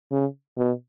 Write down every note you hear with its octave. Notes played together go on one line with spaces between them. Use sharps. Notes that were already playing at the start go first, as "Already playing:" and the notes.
C#3
B2